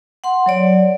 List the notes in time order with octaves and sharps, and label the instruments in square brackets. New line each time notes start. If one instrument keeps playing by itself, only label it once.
[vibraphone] F#5 C6
F#3 C#5 D5